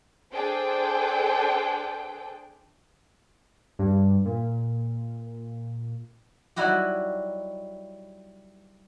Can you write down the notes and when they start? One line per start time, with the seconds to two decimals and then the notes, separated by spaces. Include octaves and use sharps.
0.32 D4 G#4 A4 C5 G5
3.79 G2
4.25 A#2
6.56 F#3 G3 D#4 E4 F#4 G4